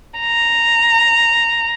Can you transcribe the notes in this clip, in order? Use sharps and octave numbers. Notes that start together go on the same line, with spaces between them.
A#5